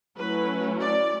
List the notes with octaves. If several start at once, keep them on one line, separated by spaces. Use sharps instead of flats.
F#3 A3 C#4 E4 B4
D5